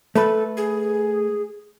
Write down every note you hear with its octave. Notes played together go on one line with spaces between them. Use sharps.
A3 A4 B4
G#4